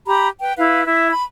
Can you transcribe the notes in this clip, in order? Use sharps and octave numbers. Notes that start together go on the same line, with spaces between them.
G4 A#5 B5
B4 G5
E4 B4 F5
E4 E5
B5